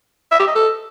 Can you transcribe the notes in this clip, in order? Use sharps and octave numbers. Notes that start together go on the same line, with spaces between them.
E5
G4
D#5
A4